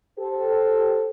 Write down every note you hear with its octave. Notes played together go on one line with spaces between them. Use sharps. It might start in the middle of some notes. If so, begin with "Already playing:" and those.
G4 A4 C5